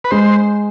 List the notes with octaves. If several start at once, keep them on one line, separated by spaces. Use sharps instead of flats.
B4
G#3 C5